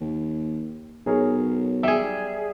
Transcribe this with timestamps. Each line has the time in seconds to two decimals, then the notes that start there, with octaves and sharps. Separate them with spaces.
0.01 D#2
1.06 B1 G#4 A#4 C#5
1.83 G3 G#4 E5